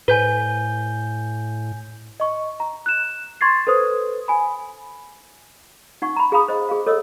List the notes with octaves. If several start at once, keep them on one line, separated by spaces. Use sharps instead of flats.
A2 B4 G#5 G6 G7
D#5 C#6
A#5
F#6 E7
C6 C#6 G#6 A6 C7
A4 B4 C5 D#6
G#5 B5
D#4 F#5 C#6
A#5 B5
G#4 F5 A#5 B5 D#6
C5 D#5
G#4 F5
A4 C#5 D#5 E6